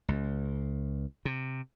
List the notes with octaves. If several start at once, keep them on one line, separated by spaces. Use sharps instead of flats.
C#2
C3